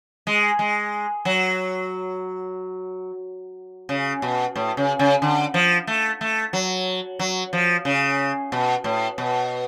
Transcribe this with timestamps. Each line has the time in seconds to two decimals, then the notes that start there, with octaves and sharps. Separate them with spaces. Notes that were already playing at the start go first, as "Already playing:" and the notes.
0.27 G#3
0.59 G#3
1.25 F#3
3.89 C#3
4.22 B2
4.56 A2
4.77 C#3
4.99 C#3
5.22 D3
5.54 F3
5.87 A3
6.21 A3
6.53 F#3
7.19 F#3
7.53 F3
7.85 C#3
8.52 B2
8.84 A2
9.18 B2